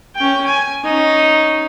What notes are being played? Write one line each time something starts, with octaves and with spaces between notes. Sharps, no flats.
C#4 G5
G#5
C#4 D#4